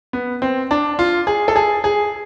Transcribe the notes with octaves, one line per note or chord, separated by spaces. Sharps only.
B3
C4
D4
F4
G#4
A4
G#4
G#4